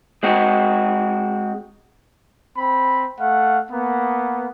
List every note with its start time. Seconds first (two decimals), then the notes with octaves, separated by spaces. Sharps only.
0.23 G#3 C4 F#4
2.56 C4 B5
3.17 A3 F5 F#5
3.69 A#3 B3